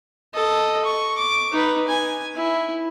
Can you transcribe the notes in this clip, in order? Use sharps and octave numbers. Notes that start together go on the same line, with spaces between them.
A4 D#5
C#6
D6
D#4 B4
G#5
E4